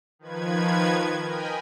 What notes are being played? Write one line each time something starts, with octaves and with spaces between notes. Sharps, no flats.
D#3 F3 B4 G#6
A#4 D#5 G5 G#5 B5